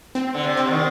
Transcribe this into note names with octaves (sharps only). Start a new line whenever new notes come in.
C4
D3
C3
C4
D3
D#3